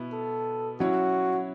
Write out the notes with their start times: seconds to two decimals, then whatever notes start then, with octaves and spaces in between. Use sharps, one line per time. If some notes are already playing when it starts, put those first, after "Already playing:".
Already playing: B2 B3 E4
0.12 A4
0.80 F#3 C#4 E4 F#4 C#5